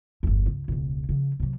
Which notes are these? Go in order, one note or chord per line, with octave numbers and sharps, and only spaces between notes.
G1 E2
C#2
E1 C#2
C#3 F3
C3 F#3